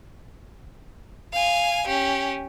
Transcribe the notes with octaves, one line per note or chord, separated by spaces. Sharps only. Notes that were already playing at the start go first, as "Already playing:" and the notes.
F5 G#5
C#4 G4